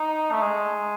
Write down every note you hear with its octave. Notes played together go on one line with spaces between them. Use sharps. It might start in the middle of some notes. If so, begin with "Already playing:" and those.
Already playing: D#4
A3
G#3